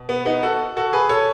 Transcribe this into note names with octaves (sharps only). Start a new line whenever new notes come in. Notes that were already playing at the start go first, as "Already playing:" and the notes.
Already playing: B2
B3
B3 D#4
F#4 A4
F#4 A4
G#4 B4
A4 C#5